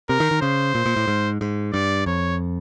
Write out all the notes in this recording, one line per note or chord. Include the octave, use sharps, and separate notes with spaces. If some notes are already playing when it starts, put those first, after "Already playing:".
C3 A#4
D#3
D#3
C#3 C5
A#2
A#2
A2
G#2
G#2
G2 D5
F2 C#5